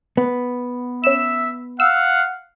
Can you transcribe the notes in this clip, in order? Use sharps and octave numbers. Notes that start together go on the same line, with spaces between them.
B3
C#4 E5 E7
F5 F#5 E6